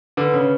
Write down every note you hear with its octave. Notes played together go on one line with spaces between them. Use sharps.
D3 B4
C#3